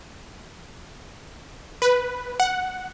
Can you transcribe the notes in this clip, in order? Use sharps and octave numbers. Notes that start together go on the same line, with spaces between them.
B4
F#5